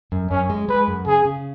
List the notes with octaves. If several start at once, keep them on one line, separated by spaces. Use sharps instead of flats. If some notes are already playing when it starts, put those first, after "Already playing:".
F#2
F#2 C#4
G#3
G#3 B4
F#2
C#3 G#4
C#3